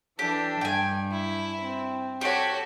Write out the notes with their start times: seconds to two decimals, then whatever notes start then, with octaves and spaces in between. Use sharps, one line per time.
0.19 E3 D4 G4 A4
0.61 G2 G5 G#5
1.11 E4
1.60 C4
2.21 F#4 G4 A4 C#5